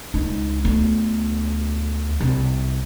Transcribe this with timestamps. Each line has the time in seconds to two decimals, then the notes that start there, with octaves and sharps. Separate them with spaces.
0.14 C#2 D#4
0.65 D2 B3
2.21 C2